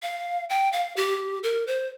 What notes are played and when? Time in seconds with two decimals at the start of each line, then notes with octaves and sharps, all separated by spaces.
0.03 F5
0.50 G5
0.72 F5
0.97 G4
1.43 A#4
1.67 C5